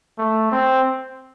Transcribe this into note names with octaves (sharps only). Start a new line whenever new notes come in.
A3
C4